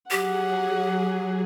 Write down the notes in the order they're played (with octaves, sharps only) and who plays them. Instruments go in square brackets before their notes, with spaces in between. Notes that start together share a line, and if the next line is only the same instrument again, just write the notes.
[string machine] F#3 G#4 [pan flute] G4 [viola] F#5